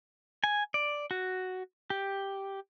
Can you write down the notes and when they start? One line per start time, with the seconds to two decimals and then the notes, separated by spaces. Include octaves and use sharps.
0.44 G#5
0.74 D5
1.11 F#4
1.90 G4